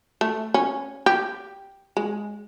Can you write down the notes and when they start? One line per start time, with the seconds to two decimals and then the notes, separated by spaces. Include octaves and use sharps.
0.21 A3
0.54 C#4
1.06 G4
1.97 G#3